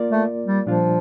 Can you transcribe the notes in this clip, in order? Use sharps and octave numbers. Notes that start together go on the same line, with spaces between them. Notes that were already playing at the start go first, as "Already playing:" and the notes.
Already playing: A#3 F4 A#4 D5
A3
G3
A#2 F3 G3 D4 F4